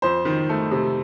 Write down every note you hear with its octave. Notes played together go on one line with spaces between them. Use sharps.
F2 C5
D#3
A3
C3